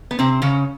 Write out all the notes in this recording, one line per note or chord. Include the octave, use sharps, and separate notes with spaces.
B3
C3 C4
C#3 C#4